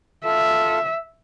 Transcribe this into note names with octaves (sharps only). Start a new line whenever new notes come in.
F4 A4 E5